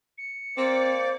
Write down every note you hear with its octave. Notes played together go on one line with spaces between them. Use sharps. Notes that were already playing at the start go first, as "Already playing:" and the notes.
C#7
A#3 C4 C5 D5 D6